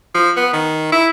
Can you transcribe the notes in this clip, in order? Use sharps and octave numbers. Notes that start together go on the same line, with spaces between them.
F3
B3
D#3
E4